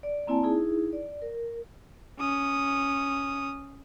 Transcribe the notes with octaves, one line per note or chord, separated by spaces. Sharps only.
D5
A#3 C4 E4 D5 G#5 A5
D#4 E4 G#4
D5
A#4
C#4 D#6